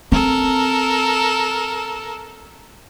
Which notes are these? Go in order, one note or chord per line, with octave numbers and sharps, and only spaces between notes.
C4 A4 A#4